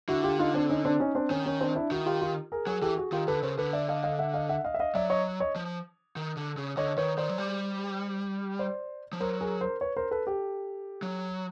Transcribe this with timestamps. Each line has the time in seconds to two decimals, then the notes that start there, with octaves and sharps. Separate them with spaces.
0.08 D3 E4 F#4
0.24 F4 G4
0.39 D#4 F4
0.54 C4 D4
0.70 C#4 D#4
0.85 C4 D4
1.00 C#4 D#4
1.15 C4 D4
1.30 D#3 C#4
1.46 C#4
1.61 C4 D4
1.76 D4 E4
1.91 D#3 E4 F#4
2.06 F4 G4
2.21 F4 G4
2.52 G#4 A#4
2.67 F#3 G#4 A#4
2.82 E3 G4 A4
2.97 F#4 G#4
3.12 D#3 F4 G4
3.28 D3 A4 B4
3.43 C#3 A#4 C5
3.58 D3 A4 B4
3.73 D5 E5
3.88 D#5 F5
4.03 D#5 F5
4.19 E5 F#5
4.34 D#5 F5
4.49 E5 F#5
4.64 D#5 F5
4.74 E5
4.80 D#5 F5
4.95 F#3 D5 E5
5.10 C#5 D#5
5.40 C#5 D#5
5.56 F3
6.16 D#3
6.37 D3
6.57 C#3
6.77 D3 C#5 D#5
6.98 D#3 B4 C#5
7.18 D#3 C5 D5
7.29 F#3
7.38 G3
8.59 C5 D5
9.13 F3
9.20 F#3 A#4 C5
9.41 G#4 A#4
9.61 A#4 C5
9.81 B4 C#5
9.96 A#4 C5
10.11 A4 B4
10.27 G4 A4
11.02 F#3